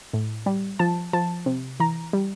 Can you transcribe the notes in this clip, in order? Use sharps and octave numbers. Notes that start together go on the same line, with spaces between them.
A2
G3
F3 A5
F3 A5
C3
E3 A#5
G3